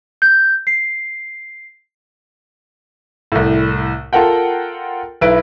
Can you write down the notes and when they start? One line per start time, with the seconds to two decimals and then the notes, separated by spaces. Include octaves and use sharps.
0.22 G6
0.67 C7
3.32 C2 A2
4.13 F4 A4 A#4 F#5 G5
5.21 B1 E4 B4 D7